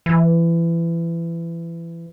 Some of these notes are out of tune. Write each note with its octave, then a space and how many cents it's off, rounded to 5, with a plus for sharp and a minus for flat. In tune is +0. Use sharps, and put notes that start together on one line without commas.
E3 +25